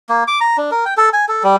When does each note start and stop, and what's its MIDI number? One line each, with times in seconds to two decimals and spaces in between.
0.09 0.24 58
0.28 0.40 86
0.41 0.57 82
0.57 0.70 62
0.71 0.85 70
0.85 0.94 79
0.97 1.09 69
1.13 1.25 80
1.28 1.43 69
1.43 1.56 55